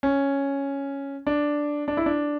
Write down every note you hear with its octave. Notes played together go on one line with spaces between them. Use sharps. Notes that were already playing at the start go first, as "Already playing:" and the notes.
C#4
D4
D4
E4
D4